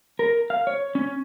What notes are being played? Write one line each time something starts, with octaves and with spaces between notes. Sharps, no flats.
A#4
F5
C#5
C#4